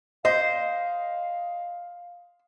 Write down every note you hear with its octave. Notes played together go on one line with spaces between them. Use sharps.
C5 D#5 F5